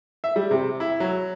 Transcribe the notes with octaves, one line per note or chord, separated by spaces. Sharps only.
E5
G3
C3
E4
F#3